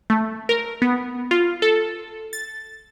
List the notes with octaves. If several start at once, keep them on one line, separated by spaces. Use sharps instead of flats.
A3
A#4
B3
F4
A4
A6